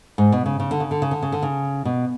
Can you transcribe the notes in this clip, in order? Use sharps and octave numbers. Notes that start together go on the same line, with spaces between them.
G#2
B2
C#3
C#3
D3
C#3
D3
C#3
D3
C#3
D3
C#3
B2